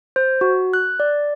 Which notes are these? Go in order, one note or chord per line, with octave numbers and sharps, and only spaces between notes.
C5
F#4
F#6
D5